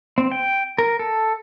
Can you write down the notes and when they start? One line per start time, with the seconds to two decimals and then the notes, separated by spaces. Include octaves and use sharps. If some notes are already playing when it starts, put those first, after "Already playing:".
0.18 C4
0.32 G5
0.78 A#4
0.99 A4